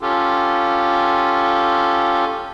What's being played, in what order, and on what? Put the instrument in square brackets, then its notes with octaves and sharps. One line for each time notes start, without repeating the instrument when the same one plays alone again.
[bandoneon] C#4 F4 G4 A4